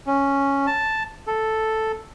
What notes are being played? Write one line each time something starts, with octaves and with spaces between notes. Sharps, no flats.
C#4
A5
A4